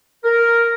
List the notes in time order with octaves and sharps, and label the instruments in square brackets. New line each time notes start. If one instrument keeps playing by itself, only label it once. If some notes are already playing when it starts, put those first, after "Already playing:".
[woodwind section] A#4